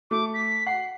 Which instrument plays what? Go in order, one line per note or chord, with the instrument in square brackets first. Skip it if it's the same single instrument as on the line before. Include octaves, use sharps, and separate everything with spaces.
[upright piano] A3 [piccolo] D6
[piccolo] B6
[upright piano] F#5 [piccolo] C7